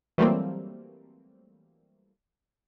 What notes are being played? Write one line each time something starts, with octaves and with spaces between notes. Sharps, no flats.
E3 F#3 G3 A3 A#3 C4